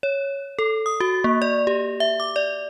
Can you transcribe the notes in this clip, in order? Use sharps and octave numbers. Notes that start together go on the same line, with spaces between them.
C#5
A4
D#6
F#4
A#3
D5
G4
E5
D6
D5